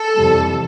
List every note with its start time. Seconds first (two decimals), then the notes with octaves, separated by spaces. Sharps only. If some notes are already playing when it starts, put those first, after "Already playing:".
Already playing: A4
0.15 F2 C3 E3 G3